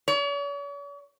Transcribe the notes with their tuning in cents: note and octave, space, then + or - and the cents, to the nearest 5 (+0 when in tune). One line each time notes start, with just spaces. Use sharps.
C#5 +45